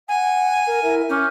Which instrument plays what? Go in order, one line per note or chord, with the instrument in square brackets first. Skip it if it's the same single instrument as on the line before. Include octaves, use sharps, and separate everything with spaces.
[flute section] F#5 [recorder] G#5
[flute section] A#4
E4 A#4 E5
[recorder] C#4 [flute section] D6 F6 G6